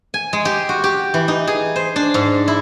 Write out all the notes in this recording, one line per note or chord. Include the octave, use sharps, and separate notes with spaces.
G#5
G#3
G4
F#4
G4
E3
D#4
G#4
C5
D4
G#2
E4